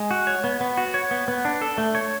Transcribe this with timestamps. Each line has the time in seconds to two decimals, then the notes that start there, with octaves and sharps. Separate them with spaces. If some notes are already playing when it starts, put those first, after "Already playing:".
Already playing: G#3
0.11 F#4
0.27 C#5
0.44 B3
0.61 B3
0.77 F#4
0.94 C#5
1.11 B3
1.28 B3
1.45 D4
1.62 A4
1.78 A3
1.95 C#5